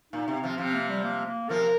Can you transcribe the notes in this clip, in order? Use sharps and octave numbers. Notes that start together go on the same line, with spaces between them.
A#2 D#4
C3
C4
C3 F3
C3 F3 C4
A#3
G3
A#3
A#3
C3 F3 A#4